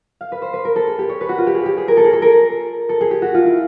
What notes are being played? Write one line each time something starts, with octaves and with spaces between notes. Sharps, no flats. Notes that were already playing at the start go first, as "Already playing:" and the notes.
F5
B4
C5
B4
A#4
A4
G#4
G4
C#5
B4
F#4
F4
G4
G#4
G4
G#4
A#4
A4
G#4
A4
A#4
A4
G#4
G4
F#4
F4
E4